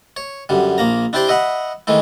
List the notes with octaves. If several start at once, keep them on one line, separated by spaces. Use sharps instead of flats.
C#5
F#2 D3 G3
A#1 A#3 A#5
D4 E4 G4 C5 D5 G5
D#5 E5 F#5 B5
D#3 E3 G#3 A3 E4